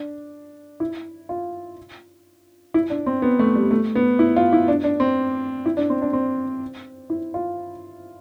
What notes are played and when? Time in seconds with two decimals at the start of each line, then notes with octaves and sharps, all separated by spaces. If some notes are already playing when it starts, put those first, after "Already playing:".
Already playing: D4
0.80 E4
1.29 F4
2.74 E4
2.90 D4
3.06 C4
3.22 B3
3.39 A3
3.55 G3
3.71 A3
3.95 B3
4.19 E4
4.36 F4
4.53 E4
4.68 D4
4.84 D4
5.00 C4
5.66 E4
5.77 D4
5.90 C4
6.02 D4
6.13 C4
7.10 E4
7.34 F4